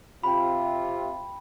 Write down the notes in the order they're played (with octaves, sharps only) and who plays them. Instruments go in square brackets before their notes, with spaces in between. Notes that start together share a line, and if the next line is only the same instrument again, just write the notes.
[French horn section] C3 F4 [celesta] G5 B5